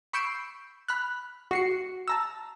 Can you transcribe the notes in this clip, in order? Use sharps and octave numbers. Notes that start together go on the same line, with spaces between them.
B5 C#6 E6 G6 C7 D7
B5 F6 F#6
F#4 C7 C#7
A5 A#5 E6